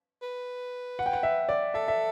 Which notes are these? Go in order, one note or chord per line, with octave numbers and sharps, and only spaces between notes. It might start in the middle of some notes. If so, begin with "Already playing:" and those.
B4
F#5
G5
F#5
E5
D5
A4 E5
E5